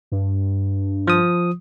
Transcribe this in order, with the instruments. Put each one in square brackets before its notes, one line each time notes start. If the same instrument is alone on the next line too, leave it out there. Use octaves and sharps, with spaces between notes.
[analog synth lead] G2
[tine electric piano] F3 D#6